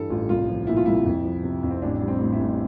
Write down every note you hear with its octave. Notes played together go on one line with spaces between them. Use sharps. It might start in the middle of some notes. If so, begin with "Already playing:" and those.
Already playing: G2 E3 G3 A4
A1 F4
C2 F4
F3
A#2 E4
F4
C2 E4
F2
F3
C3
F2
C4
A1 D4
G3
C4
A2
E4
A1